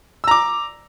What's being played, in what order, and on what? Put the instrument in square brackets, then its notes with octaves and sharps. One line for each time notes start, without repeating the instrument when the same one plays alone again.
[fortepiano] E6
A#5
D6